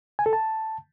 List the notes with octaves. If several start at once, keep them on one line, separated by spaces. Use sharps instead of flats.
G#5
A4
A5